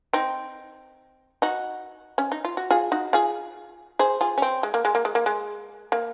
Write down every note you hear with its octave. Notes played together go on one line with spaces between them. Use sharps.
C4 D#4
D#4 F#4
C#4
D#4
F4
F#4
F4 G#4
D#4 F#4
F4 G#4
G#4 C5
F4 G#4
C#4
C4
G#3
A#3
G#3
A#3
G#3
A#3
G#3
A#3